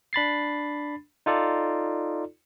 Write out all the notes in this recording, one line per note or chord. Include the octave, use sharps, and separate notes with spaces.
D4 B5 A6 C7
D#4 F4 A4 D5